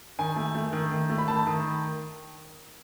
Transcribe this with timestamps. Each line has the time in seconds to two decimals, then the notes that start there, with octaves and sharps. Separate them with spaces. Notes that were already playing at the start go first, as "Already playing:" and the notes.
0.19 D#3 G#5
0.36 A3
0.55 A3
0.73 D#3
0.92 D#3
1.09 A3
1.18 B5
1.28 D#3 A5
1.47 D#3